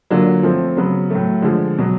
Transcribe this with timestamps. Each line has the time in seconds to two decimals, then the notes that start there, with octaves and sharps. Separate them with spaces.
0.11 D3 F#3 A#3 D4 F4
0.43 F3 A3 C4
0.77 C#3 F#3 B3
1.10 A2 F#3 A3
1.42 D3 F3 G#3
1.78 B2 F#3